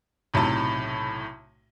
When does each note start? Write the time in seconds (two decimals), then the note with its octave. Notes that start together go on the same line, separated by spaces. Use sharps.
0.34 B1 A2 C3 A5